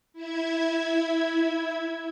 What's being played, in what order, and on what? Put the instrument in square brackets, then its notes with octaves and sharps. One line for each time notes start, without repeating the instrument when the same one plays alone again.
[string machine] E4 E5 G#6